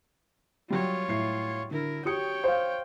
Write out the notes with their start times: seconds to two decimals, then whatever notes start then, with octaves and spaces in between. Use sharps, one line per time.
0.70 F#3 G3 F4 C#5
1.08 A2 C7
1.71 D3 E4 A#4
2.05 F#4 G4 C#5 G5 D#6 C#7
2.44 C5 F5